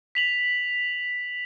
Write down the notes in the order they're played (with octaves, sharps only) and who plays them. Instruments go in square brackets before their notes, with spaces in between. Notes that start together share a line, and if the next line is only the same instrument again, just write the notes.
[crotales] B6 F7 F#7